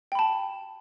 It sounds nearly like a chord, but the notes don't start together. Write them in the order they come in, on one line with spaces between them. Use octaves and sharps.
G5 B5 A5